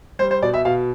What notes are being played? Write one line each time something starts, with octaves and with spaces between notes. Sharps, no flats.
G3 C5
C5
B2 D5
E5
B2 F5